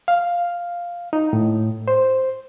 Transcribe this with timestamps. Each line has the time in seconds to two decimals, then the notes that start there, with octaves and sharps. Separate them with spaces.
0.08 F5
1.13 D#4
1.33 A2
1.88 C5